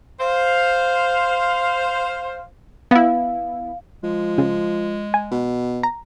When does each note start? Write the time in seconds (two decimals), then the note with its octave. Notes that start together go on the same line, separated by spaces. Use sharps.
0.20 C5 F5
2.91 B3 E4 F5
4.04 F3 G#3
4.38 C#3
5.14 G#5
5.32 B2
5.83 A#5